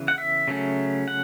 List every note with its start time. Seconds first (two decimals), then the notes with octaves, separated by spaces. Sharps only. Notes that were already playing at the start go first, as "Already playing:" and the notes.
Already playing: C#3 E3 B3
0.08 F#5
0.18 E5
0.48 C#3 F#3 A3 C#4
1.08 F#5